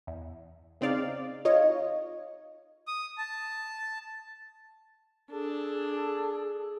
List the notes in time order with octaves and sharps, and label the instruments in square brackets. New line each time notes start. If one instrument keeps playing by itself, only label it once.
[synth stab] E2
C#3 C4 D#4 D5 F5
D#4 F4 C#5 D#5
[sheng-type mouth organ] D#6
A5
[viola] D4 [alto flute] G#4 [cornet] A4